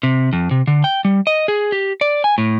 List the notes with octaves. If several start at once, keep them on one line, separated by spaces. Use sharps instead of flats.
C3
F2
C3
D3
G5
G3
D#5
G#4
G4
D5
G#5
A2